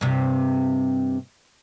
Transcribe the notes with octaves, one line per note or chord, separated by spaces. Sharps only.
G2 C3